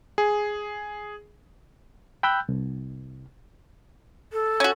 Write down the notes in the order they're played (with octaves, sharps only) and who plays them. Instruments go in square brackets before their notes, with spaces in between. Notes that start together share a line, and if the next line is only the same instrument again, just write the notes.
[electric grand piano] G#4
[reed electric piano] G5 B5 E6 F#6 G6
C2
[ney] A4
[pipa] C#4 F#4